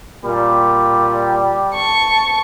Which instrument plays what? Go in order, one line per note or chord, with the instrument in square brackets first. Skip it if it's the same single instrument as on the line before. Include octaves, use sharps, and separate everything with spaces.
[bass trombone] A#2 [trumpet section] G3
[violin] A5 C#6